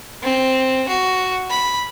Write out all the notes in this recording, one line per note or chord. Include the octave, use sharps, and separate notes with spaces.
C4
F#4
B5